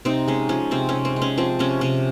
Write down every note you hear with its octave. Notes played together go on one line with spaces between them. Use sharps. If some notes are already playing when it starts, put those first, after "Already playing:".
C3 C4 D#4
G#3 C#4
F3 C#4
C3 C4
C3 C#4
C4
G#3
C#4
F3 C4
C3 C#4
C3 C#4